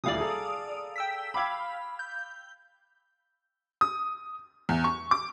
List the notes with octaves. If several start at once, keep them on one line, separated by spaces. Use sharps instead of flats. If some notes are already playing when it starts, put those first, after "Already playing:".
D#1 D2 E4 D5 F5 D#6
G#4 A4 A#5
G5 E6 B6
F5 B5 D6 E6 G#6
G6
D#6
E2
C#6
D6